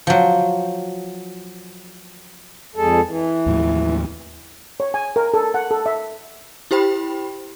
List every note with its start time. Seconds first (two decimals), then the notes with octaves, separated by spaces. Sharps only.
0.07 F3 F#3
2.76 F2 G#3 A4
3.05 E3
3.46 D#2 A2 F3
4.80 C#5
4.94 G#5
5.16 A#4
5.34 A4
5.54 F#5
5.71 A4
5.86 E5
6.71 E4 G4 C5 G5 B5